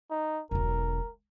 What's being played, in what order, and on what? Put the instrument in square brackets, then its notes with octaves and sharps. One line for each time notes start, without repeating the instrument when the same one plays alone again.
[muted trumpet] D#4
[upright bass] E1 B1 [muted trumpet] A#4